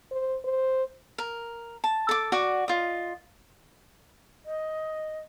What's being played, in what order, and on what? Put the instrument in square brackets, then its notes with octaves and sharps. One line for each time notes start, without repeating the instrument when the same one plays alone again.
[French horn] C5
C5
[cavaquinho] A#4
A5
A4 D6
F#4 D5 F#5
F4 D#5
[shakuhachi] D#5